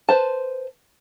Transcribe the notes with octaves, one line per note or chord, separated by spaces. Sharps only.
B4 C5 A5